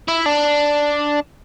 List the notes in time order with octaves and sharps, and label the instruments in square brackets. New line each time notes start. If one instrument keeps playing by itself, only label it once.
[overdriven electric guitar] E4
D4